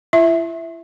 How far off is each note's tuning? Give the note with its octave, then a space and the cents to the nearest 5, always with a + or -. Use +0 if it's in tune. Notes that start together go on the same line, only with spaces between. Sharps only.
E4 +40 E5 +0